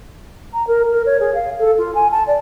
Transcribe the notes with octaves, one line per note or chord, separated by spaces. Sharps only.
A#5
A#4
A#4
C#5
G#4
F5
A4
F4
G#5
A5
D5